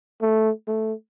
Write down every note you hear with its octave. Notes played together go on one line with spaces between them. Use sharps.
A3
A3